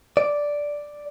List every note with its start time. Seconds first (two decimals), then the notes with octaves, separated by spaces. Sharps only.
0.17 D5